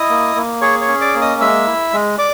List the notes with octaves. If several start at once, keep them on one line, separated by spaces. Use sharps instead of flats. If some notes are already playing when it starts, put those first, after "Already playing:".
Already playing: E4 D#5 D#6
A#3
A#3
G#4 C#5 C#6
C#5 C#6
C#4
D5 D6
A#3
D#5 D#6
G#3 E5 E6
E4
G#3
D5 D6